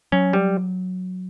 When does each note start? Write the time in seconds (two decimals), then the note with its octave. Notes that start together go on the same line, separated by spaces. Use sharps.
0.12 F#3 C#4
0.33 G3